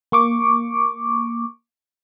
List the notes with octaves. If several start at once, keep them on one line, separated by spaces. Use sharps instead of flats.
A#3 C#6 D6